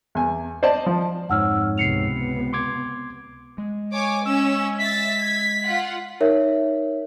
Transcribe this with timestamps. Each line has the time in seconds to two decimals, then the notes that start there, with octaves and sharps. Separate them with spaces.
0.15 E2 G#5
0.63 C5 D5 D#5 A5
0.86 F3
1.30 F2 G#2 C#5 F#5 E6 F6
1.78 C#2 C3 B3 C7 C#7 F7
2.53 C6 D6 G#6
3.58 G#3
3.93 C#5 G#5 D6
4.25 C#4 E6
4.78 E5 A6 B6
5.20 G#6
5.64 F4 F#5
6.20 D#4 A#4 C#5 E5